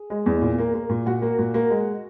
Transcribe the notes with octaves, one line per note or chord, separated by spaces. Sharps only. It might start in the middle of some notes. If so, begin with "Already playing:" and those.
Already playing: G#4
G#3
E2
A#2
A#3
A#3
A#2
A#2 F#4
A#3
A#2
A#3
G#3